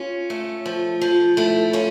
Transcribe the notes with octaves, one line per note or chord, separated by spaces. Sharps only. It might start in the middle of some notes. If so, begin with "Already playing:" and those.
Already playing: C#4 F4
A3
F3
F3
A3 E4
C#4 F4